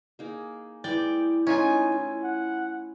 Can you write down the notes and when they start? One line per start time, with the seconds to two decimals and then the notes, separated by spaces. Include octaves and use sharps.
0.19 A#3 D#4 G#4
0.84 E3 G#3 E4 D5 G5
1.47 A3 C#4 D#4 F4 G#5
1.92 E4
2.24 F#5